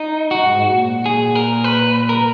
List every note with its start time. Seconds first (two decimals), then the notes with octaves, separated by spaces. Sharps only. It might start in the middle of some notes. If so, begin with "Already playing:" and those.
Already playing: D#4
0.31 F#4
0.46 G#2
0.76 A#2
1.06 G#4
1.35 A#4
1.64 B4
2.09 A#4